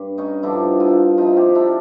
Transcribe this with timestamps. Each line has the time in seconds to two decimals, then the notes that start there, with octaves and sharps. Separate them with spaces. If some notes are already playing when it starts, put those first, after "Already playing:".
Already playing: G2
0.18 C#4 D#4
0.43 G2 D3 F3 D4 E4
0.80 D#4 F4
1.17 C3 F3 D#4 F4
1.36 F4 G4
1.55 D4 E4